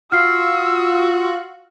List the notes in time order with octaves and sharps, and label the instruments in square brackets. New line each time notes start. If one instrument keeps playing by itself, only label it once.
[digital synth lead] F4 [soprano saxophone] F#4 [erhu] E6 [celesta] F6 C7